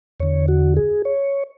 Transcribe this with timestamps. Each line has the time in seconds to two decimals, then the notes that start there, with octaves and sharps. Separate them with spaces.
0.20 E2 D3 C#5
0.48 F#4
0.77 G#4
1.05 C#5